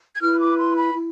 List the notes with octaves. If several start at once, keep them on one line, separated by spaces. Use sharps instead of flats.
G#6
E4 B4 F6
D6
C6
B5
E4